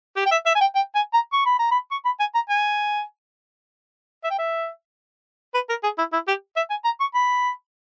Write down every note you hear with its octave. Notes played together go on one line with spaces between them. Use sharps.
G4
G5
E5
E5
G#5
G5
G5
G#5
A#5
C#6
B5
A#5
B5
C#6
B5
G#5
A#5
G#5
E5
G5
E5
B4
A#4
G#4
E4
E4
G4
E5
G#5
A#5
C#6
B5